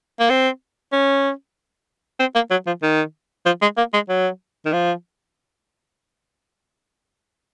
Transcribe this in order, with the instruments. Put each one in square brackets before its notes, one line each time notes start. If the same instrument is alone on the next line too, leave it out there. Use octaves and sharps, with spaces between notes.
[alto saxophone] A#3
C4
C#4
C4
A#3
F#3
F3
D#3
F3
G#3
A#3
G#3
F#3
D#3
F3